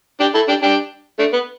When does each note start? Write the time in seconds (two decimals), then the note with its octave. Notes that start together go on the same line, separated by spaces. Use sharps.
0.20 D4 G4
0.34 E4 A4
0.48 D4 G4
0.63 D4 G4
1.19 A3 D4
1.33 B3